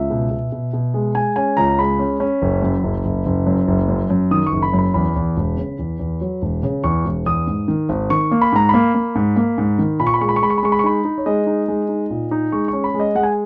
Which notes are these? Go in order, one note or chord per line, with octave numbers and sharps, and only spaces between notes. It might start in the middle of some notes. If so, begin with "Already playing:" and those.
Already playing: C#2 E5
B2
B2
B2
B2
G#3
G#3 G#5
C#4 G#5
C#2 A#5
G#3 B5
C#4
C#4
F#1
F#2
F#1
F#1
F#1
F#2
F#1
F#2
F#2
D#3 D#6
C#6
F#1
B5
F#2
B5
E2 B5
E2
E1
C#3
E2
E2
F#3
E1
C#3
E2 C#6
E1
E2 D#6
G#2
D#3
G#1
D#3 C#6
A#3
B5
G#2 A#5
A#3 B5
A#3
G#2
A#3
G#2
D#3
A#2 B5
C#6
B5
G#3 C#6
B5
C#6
G#3 B5
C#6
B5
G#3 C#6
B5
C#6
D#4 B5
D#4
C#5
G#3 D#5
D#4
G#3
D#4
A#2
D#4
G#3 C#6
C#4 C#6
B5
G#3
D#5
G#3 F#5
G#5